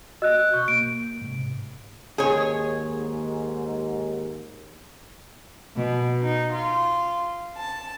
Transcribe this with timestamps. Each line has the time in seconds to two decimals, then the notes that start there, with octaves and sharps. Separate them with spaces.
0.22 F#4 D#5 E6 F#6
0.53 B2 C#6 G6
0.68 A#3 D7
1.22 G#2 C3
2.18 D#2 G#2 G#4 C#5
5.76 B2
6.21 D#4
6.54 F4
7.57 A5